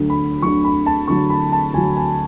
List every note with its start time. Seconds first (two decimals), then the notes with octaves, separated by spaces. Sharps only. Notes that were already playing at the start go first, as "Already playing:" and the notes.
Already playing: D2 D3 F#3
0.10 B5
0.42 D2 D3 F#3 C#6
0.64 B5
0.86 A5
1.08 D2 D3 F#3 C#6
1.30 B5
1.52 A5
1.73 D2 D3 F#3 G#5
1.96 G#5